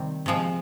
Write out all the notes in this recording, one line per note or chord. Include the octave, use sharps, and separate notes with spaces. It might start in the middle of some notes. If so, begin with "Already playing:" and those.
Already playing: C3 D#3 G3 C4
C3 F3 G#3